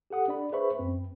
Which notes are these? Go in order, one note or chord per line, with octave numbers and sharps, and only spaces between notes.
G4 A4 F#5 D#6
D4 D5 B5
G#4 B4 C5 E5 B5 C#6
F#2 C4